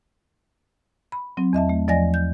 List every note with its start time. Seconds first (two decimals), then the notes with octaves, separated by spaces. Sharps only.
1.12 B5
1.37 F#3 C4
1.53 E2 D#5 E5 A5
1.69 A3
1.88 E2 F3 D5 D#5 G#5 A#6
2.14 G6